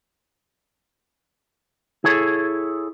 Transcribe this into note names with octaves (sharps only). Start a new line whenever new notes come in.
E4 G#4 A4 C#5